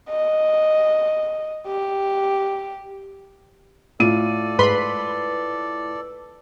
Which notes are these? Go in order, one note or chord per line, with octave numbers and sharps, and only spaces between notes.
D#5
G4
A2 F4 A4 D5 D#7
G#2 B4 B5 C6